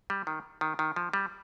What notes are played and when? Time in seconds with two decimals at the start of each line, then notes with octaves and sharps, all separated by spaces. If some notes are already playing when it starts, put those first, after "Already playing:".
0.10 G3
0.27 D#3
0.61 D#3
0.79 D#3
0.96 F3
1.13 G3